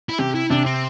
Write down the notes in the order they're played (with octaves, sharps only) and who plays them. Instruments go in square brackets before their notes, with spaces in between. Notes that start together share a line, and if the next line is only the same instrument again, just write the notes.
[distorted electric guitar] E4
[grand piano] C3 [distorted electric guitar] G4
[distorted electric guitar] E4
[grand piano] C3 [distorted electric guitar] D4
[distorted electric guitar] C4